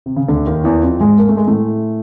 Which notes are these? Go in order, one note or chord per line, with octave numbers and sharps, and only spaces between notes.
C3
C#3
D2 D3
D#2 D#3
E2 E3
F2 F3
G#2 G#3
A#3
A3
G#3
A2 A3